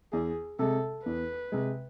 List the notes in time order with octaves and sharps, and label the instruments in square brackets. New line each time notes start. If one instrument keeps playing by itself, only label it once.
[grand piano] E2 [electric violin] G#4
[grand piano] C3 G#3 [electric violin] A4
[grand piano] E2 [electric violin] B4
[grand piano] C3 G#3